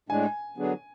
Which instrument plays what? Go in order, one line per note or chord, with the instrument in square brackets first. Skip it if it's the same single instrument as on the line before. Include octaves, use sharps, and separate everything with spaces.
[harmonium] A2 G#3 D4 [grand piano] G#5
[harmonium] D3 F#3 B3 D4 G#4